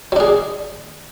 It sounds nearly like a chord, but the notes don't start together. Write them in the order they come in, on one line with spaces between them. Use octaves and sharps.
F#3 D4 G#4